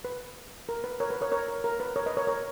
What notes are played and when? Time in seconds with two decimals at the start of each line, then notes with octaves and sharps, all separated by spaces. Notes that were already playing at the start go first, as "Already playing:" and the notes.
0.05 B4
0.69 A#4
0.84 B4
1.00 A#4 C#5
1.10 B4
1.21 A#4 C#5
1.32 A#4 C#5
1.48 A#4
1.64 A#4
1.80 B4
1.96 A#4 C#5
2.06 B4 D#5
2.17 A#4 C#5
2.27 A#4 C#5